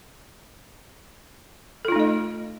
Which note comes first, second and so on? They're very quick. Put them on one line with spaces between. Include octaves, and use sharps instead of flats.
A4 F4 D#4 A3 D#5